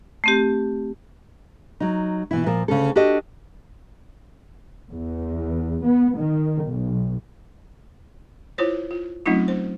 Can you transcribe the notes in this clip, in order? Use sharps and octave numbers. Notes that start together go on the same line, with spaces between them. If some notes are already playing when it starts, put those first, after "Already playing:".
A3 C4 G4
F#3 D#4
B2 E3 E4
A#2 F3 A#4
D2 C#3 C#4 A4
D4 F#4 G4 A4 D#5
E2
B3
D#3
B1
E4 F4 C5 C#5
F4
F#3 A3 C4 C#4 D#4 F4
C5